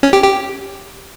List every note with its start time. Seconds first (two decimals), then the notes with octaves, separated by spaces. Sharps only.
0.03 C#4
0.13 G4
0.23 G4